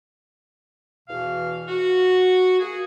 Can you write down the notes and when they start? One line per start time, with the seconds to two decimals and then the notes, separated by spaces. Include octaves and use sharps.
1.09 E2 B2 E3 F5
1.68 F#4
2.60 A#3 F#4 G#4